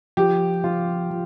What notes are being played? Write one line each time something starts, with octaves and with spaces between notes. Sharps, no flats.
F3 G4
F3 F4
F3